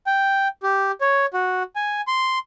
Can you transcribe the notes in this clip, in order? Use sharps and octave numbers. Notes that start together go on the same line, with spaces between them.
G5
G4
C#5
F#4
G#5
C6